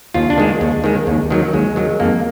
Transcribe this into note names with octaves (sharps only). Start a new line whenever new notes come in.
D#2 F4
D4
D#3 G#3
D#2
D#3 G#3
D#2
D#3 F#3
D#2 G#3
D#3 F#3
F2 A#3